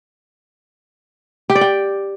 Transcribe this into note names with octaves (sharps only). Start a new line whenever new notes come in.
G4
D5
G5